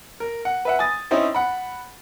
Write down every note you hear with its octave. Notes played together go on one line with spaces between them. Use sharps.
A#4
F#5
B4 E5 F#5
G#5 D#6 A6
C4 C#4 D#4 E4 C5
F#5 B5